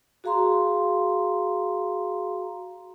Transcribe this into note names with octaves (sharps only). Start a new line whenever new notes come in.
F#4 G#4 F5 A#5 C6